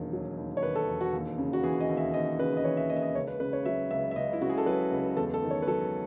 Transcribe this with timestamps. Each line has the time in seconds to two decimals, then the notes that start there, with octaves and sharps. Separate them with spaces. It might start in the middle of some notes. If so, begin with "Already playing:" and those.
Already playing: E1 D#2 D#3 F#3
0.13 F#3
0.37 D#2
0.57 C#5
0.63 D#3 B4
0.75 A4
0.88 E1
1.01 F#4
1.13 D#2
1.38 C#3
1.53 F#4
1.63 E3 G#4
1.81 D#5
1.89 D#2
1.97 E5
2.14 D#2 D#5
2.39 C#3 B4
2.57 D#5
2.64 E3 C#5
2.77 E5
2.90 D#2 D#5
2.96 E5
3.03 D#5
3.15 C#2 C#5
3.28 B4
3.40 C#3 B4
3.53 C#5
3.65 F#3 E5
3.91 C#2 E5
4.11 E5
4.16 C#2 D#5
4.33 E4
4.41 C#3 F#4
4.50 G#4
4.58 A4
4.66 F#3 B4
4.91 C#2
5.17 E2 A4
5.34 A4
5.42 D#3
5.50 C#5
5.62 B4
5.67 F#3 A4